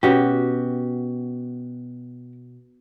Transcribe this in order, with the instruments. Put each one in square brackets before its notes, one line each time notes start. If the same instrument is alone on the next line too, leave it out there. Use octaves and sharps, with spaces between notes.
[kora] B2 [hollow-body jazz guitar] C#4 F#4 G4